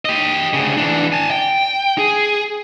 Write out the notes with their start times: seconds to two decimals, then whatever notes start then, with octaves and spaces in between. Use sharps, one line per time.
0.05 G4 D#5
0.53 D2 C#3
0.77 E3 D4
1.12 G#5 A5
1.31 G5
1.98 G#4